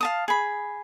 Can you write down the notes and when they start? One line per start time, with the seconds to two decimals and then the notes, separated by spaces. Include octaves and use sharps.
0.01 F5 A5 D#6
0.28 G#4 B5